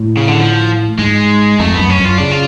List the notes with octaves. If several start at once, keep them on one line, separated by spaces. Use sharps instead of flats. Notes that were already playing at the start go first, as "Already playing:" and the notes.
Already playing: A2
C#3
D3
F3
G#2 G#3
F2 A3
B3
F#2
C#4
F#2
F4
C#3 D4
F4